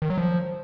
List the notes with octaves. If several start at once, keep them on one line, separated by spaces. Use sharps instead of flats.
D#3
F#3
F3